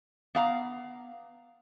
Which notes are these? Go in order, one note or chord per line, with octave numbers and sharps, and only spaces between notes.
B3 F5 A#5